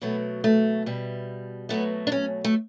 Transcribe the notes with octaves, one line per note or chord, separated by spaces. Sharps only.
B2 F#3 A3 B3
A3
B2 G3
B2 F#3 A3 B3
D4
C#4
A3